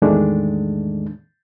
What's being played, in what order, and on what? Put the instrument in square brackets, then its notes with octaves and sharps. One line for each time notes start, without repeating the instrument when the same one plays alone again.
[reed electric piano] E2 A2 D#3 G#3 A3 D4